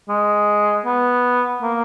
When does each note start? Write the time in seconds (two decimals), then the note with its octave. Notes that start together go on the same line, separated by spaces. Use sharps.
0.09 G#3
0.85 B3
1.62 A#3